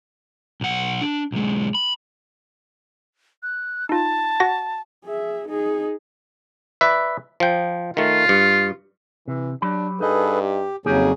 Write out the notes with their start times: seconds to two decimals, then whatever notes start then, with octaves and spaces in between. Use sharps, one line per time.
0.61 B1 F#5
1.02 D4
1.32 B1 G#3
1.75 B5
3.43 F#6
3.89 D#4 F4 A5
4.40 F#4 F#5 A#6
5.04 G#4 E5
5.48 D#4 G#4
6.81 B4 D5 E5
7.40 F3 G5
7.97 D#3 A3 F4
8.29 G2
9.28 C3 E3
9.62 F#3 D4 G4 B5
10.01 G2 D#4 G#4 A4 B4 D#5
10.42 G4
10.86 F2 C#3 F#3 A#3 D#4 G4 G#4